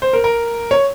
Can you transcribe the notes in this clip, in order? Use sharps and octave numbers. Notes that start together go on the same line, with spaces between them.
C5
A#4
A#4
C#5